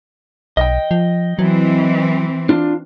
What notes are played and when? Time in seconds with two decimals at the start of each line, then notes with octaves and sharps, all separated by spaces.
0.57 B1 D#5 G5
0.91 F3
1.39 E3 F#3 C4
2.49 D4 F4